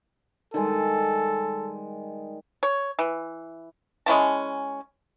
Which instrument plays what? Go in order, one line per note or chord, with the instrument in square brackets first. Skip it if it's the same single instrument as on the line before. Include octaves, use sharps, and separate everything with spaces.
[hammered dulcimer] D#3 G3 G#3 [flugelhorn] A4
[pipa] C#5
E3
G#3 C#4 E4 A5